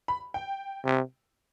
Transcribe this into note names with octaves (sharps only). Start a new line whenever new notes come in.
B5
G5
C3